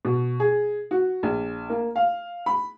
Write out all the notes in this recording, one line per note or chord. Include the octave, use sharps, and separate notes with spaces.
B2
G#4
F#4
A#1
A#3
F5
B5